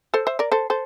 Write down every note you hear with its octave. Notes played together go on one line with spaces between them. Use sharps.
A4 C5
C5 E5
A#4 D5
A4 C5
A4 C5